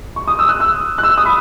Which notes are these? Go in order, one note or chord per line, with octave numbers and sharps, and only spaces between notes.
C#6
D#6
E6
F#6
E6
F#6
E6
D#6
B5